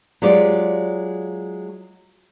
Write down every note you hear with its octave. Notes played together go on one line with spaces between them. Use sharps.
F#3 G#3 F4 G4 D5